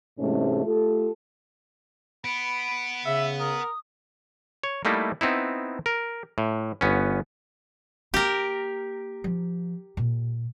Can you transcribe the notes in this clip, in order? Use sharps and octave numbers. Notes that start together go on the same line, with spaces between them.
G#2 C3 E3 G#3 A3 C#4
A3 F4 G4 A4
B3 B5 D7
C#3 E5
A#4 D#6
C#5
G3 A3 A#3 D#4 E4
B3 C4 D#4 E4
A#4
A2
G1 B3 C#4
A#3 G4 A#4
F3
A#2